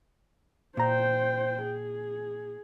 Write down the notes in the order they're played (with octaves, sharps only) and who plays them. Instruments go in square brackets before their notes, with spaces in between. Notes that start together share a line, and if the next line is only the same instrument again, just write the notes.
[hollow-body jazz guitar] A#2 A#5 [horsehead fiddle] C5 G5
[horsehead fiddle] G#4